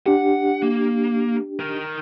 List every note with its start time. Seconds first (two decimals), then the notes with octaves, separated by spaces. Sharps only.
0.06 D4 G4 F#5
0.63 A#3
1.59 D#4 A#4